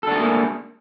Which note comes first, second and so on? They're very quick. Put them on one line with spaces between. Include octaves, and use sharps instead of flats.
A4 D4 A3 G#4 A#3